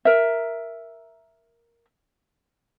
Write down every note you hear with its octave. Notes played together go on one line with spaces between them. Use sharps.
A#4 E5